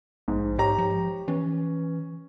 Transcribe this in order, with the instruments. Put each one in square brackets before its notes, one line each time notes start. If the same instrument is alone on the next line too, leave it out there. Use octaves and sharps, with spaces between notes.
[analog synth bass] A#1 [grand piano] G#2
[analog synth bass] G#2 [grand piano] G4 C#5 A#5
[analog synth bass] F3
[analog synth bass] E3 [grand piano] C#4